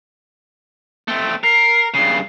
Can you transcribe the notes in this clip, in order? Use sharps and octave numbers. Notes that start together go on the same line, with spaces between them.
A3 C4
A#4 C7
G2 C#3 C7